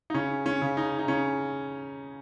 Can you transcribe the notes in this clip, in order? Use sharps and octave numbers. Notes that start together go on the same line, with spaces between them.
D#4
C#3 C#4
C#4
C#3
D#4
D#4
C#3 C#4